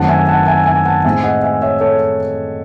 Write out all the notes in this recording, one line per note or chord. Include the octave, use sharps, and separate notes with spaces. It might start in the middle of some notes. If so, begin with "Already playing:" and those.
Already playing: F#2 D#3 A3 C4 F#5 A5
E5 G#5
F#5 A5
E5 G#5
E5 G#5
F#5 A5
A2 G#3 C4 D#4 E5 G#5
D#5 F#5
E5 G#5
C#5 E5
A4 C#5